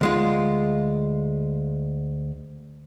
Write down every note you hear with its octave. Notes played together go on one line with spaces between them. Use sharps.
D2 G#3 F4